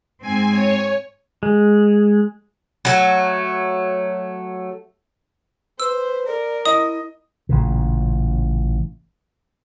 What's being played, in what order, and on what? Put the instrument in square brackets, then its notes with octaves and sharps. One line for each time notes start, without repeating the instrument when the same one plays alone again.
[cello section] G#2 C4 [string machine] G#5
[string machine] C#5
[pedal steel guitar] G#3
[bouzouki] F#3 A3
[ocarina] B4 [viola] C5 [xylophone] E6
[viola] A#4 [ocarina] D5
[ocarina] E4 [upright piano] D#5 [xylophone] D#6
[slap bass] A1 A#2 C#3